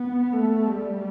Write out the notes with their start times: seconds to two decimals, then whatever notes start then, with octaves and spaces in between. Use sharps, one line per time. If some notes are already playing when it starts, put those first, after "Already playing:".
Already playing: B3
0.33 A3
0.69 G3